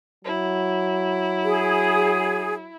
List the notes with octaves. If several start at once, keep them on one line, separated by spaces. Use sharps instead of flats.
F#3 E4
G#4